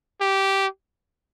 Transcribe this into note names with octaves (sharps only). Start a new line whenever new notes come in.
G4